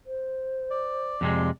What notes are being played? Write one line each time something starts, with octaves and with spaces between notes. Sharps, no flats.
C5
D5
F2 C3 G#3